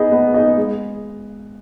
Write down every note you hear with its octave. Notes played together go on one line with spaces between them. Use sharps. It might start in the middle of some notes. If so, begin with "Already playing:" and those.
Already playing: B3 D#4 G#4 D#5
B3
D#4 G#4 D#5
G#3